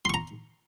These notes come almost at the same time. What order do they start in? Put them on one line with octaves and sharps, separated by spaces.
C6 C#6 A#5